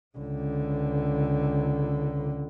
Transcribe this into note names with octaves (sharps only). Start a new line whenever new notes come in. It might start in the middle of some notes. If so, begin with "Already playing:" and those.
C#2 D3